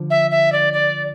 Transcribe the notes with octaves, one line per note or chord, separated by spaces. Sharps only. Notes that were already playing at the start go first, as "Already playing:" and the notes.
Already playing: D3 F3
E5
E5
D5
D5